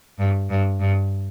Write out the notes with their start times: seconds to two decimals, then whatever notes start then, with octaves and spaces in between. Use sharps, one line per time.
0.19 G2
0.50 G2
0.80 G2